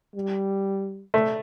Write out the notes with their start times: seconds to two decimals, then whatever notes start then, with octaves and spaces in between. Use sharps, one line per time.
0.15 G3
1.14 A3